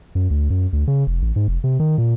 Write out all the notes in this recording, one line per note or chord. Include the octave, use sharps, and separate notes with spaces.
F#2
D2
F#2
D2
C#3
F1
A1
G#2
F1
C3
D#3
A#2